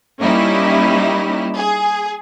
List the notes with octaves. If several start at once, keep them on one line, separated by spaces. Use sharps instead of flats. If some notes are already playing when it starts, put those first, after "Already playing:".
G3 A#3 C#4 D#4 E4 G4
G#4